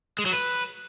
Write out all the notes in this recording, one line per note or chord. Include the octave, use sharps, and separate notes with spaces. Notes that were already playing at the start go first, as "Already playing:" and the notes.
G#3
F#3
B4